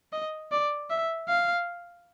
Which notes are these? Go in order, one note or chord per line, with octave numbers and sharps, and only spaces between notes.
D#5
D5
E5
F5